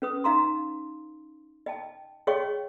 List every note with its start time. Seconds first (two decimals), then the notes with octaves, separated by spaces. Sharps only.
0.02 C#4 B4 D#6
0.24 D#4 F5 A#5 C6
1.66 D#5 G5 A5
2.27 G#4 C#5 D#5 F5 G5 C#6